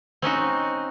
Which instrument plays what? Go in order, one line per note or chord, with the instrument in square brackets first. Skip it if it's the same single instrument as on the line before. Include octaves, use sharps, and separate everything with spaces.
[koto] C4 C#4 D#4 F#4